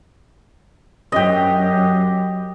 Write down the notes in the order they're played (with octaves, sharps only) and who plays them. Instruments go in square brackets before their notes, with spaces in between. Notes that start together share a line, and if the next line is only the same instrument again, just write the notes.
[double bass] F#2 [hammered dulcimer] G4 D#5